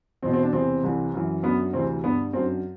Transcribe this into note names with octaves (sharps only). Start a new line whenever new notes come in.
E2 B2 C4
C4
D4
E2 C3 E3 C4
C2 C3 E3
F#2 E3
F#2 D3 B3
D2 C3 E3 C4
G2 D3 B3
F#2 D3 C4